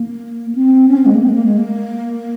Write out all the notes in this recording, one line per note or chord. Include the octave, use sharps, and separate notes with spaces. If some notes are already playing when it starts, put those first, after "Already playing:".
Already playing: A#3
C4
C#4
C4
G#3
A#3
C4
G#3
A#3
G#3
A#3